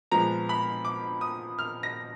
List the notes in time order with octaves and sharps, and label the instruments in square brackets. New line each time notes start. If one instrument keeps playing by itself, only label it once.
[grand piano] A#2 F3 G#3 B3 A#5
B5
D6
D#6
F6
A#6